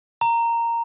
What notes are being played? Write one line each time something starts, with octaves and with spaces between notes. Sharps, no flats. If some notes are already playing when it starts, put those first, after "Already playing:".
A#5